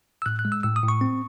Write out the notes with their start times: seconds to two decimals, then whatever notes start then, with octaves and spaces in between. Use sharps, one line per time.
0.22 E6
0.26 A2 F#6
0.39 F#6
0.45 G#3
0.52 E6
0.63 A2 E6
0.76 D#6
0.83 A2
0.88 C#6
1.01 C4